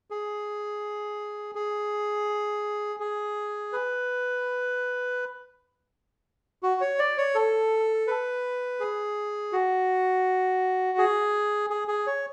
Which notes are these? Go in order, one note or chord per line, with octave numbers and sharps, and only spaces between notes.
G#4
G#4
G#4
B4
F#4
C#5
D5
C#5
A4
B4
G#4
F#4
G#4
G#4
G#4
C#5